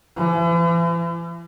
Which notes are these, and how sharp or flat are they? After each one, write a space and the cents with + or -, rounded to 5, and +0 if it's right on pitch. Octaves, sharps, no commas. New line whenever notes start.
E3 +45